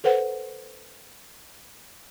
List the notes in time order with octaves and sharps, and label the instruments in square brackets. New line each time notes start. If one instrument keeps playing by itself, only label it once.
[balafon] A4 B4 C5 F#5